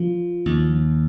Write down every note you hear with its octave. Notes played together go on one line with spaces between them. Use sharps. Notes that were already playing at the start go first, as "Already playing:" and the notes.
Already playing: F3
D#2